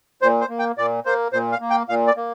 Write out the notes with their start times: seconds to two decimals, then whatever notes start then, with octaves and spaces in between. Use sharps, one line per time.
0.22 A#2 C5
0.41 C5
0.50 A#3
0.59 G5
0.78 A#2 D5
1.06 A#3 C5
1.33 A#2 C5
1.52 F5
1.61 A#3
1.70 G5
1.89 A#2 F5
2.07 D5
2.16 A#3